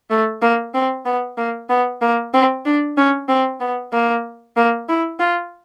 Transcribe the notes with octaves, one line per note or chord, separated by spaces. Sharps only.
A3
A#3
C4
B3
A#3
B3
A#3
C4
D4
C#4
C4
B3
A#3
A#3
E4
F4